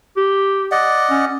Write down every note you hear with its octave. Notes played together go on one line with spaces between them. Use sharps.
G4
D5 D#5 F#5
C#4